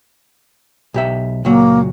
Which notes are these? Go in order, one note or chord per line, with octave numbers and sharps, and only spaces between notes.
B1 G4 E5
C#2 A#2 F#3 A#3